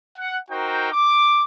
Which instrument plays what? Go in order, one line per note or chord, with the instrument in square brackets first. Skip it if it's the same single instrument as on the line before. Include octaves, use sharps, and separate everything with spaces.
[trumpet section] F#5
D#4 F#4 A#4 C5 G5
D6